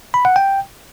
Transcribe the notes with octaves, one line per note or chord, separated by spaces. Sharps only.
B5
F#5
G5